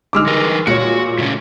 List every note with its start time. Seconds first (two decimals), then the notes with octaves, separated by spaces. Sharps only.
0.13 D3 G#3 D#4 D6 E6 F6
0.26 E3 A#4 B4
0.67 A#2 G#3 F#4 C#5 C#7
1.18 A2 C#3 C#4